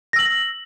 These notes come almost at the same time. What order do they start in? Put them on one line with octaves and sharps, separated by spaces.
A#6 E6 F#7